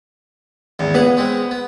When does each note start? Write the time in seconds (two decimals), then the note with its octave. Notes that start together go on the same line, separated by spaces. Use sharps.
0.79 G#1 E2
0.94 C#2 B3 G#4 F#5
1.17 G#3 C4 C#4
1.51 B3